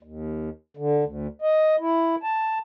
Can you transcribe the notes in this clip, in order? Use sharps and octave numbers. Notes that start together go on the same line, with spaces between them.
D#2
D3
D2
D#5
E4
A5